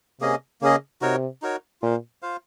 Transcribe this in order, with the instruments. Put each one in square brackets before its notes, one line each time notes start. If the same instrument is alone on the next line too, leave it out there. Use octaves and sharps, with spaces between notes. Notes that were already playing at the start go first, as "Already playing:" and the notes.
[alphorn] C3 [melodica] A#3 C#4 G#4 D#5
[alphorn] C#3 [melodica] A#3 C#4 G#4 D#5
[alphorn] C3 [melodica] D#4 F#4 A#4 C#5
[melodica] D#4 F#4 A#4 C#5
[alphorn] A#2 [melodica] F4 C5 F5
[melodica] F4 C5 F5